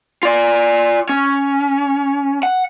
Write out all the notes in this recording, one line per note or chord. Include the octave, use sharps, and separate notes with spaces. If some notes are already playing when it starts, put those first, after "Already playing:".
F4 D5
C#4
F#5